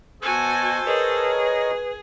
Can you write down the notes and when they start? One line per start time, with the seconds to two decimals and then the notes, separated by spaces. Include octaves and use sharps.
0.22 B2 F#4 A4 C5 G#5 A5
0.87 G#4 A#4 B4 C#5 D#5